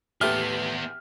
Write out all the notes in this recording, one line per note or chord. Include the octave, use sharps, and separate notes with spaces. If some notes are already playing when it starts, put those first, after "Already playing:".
A1 B3 G4 G#4 E5 A5 C6 F6